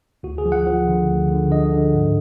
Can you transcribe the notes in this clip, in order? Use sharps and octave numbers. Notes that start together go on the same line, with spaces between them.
D2 F#4
G#4
F3
F#5
F3
D3
D2
D3
D3 D#5
D3
G#2